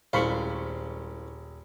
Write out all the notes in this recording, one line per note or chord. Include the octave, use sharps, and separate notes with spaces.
D#1 C2 G#3 C5 F5 B5 C#6